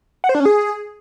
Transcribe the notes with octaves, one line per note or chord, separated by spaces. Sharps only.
F#5
C5
D4
C#4
G#4